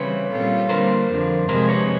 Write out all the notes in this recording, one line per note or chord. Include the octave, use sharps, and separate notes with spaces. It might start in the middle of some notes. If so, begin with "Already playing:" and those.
Already playing: C#3 E3 G3 C4 B4 C#5
A#2 G3 C4 F4 A4
D3 G3 A#3 A#4 C5
F2 D3 F3
C3 F3 G#3 A#4 C5
B4 C#5